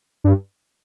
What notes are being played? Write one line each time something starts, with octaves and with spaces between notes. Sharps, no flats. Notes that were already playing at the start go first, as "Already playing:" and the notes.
G2